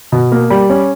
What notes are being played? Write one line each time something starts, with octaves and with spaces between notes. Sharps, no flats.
B2
A#3
G3
C#4